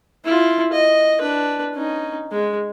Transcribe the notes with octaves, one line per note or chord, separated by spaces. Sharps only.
E4 F4
D#5
D4 B4
C#4 D#4
G#3